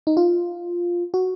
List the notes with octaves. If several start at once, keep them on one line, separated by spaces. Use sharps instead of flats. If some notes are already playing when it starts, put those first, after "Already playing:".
D#4
F4
F#4